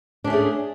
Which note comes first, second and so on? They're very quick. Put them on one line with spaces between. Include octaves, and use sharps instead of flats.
D4 C#4 A3 G#4